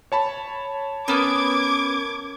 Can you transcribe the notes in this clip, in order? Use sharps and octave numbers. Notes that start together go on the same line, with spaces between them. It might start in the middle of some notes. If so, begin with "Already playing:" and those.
C#5 A5 B5
B3 C#4 A#4 D6 G#6